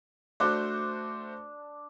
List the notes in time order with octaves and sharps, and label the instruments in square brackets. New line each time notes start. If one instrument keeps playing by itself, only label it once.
[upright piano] A3 F#4 C5 [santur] D4